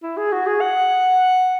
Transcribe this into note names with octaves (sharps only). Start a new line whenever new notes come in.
E4
G#4
F#4
G#4
F#5